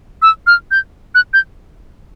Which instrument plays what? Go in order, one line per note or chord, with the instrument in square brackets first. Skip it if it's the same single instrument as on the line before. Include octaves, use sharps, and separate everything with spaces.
[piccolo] E6
F6
G6
F#6
G6